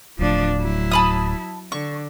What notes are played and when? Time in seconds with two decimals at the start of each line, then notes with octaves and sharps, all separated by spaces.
0.19 D1 A2 F3 D4
0.58 F#3 E4
0.91 A5 B5 D#6
1.72 D3 C#6